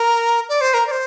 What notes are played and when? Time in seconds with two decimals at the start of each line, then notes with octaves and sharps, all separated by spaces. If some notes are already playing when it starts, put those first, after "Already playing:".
Already playing: A#4
0.49 D5
0.61 C5
0.74 A#4
0.87 D5
0.91 C5